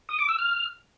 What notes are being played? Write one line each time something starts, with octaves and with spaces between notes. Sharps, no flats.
D#6
D6
E6
F6